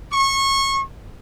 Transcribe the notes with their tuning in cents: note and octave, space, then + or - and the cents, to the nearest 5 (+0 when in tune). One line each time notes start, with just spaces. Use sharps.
C#6 -25